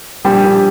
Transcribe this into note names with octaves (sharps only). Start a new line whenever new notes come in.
A#1 G3 G4
A#1